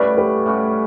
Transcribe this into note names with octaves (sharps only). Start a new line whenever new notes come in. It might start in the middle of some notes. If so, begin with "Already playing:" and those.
Already playing: A2 G3 C#4 F#4 B4 D5
G4 B4
A2 G3 C#4 F#4